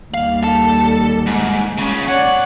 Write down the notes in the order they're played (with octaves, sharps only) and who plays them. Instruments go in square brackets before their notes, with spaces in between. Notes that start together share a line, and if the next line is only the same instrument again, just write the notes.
[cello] D#2 G3 [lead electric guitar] F5
[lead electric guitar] A4
G#2
C#2 C#3
[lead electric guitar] B1 F#5 [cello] C#5 D5